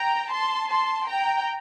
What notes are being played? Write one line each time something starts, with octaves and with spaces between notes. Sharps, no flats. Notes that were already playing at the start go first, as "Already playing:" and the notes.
Already playing: G5 A#5
A5 C6
A5 C6
G5 A#5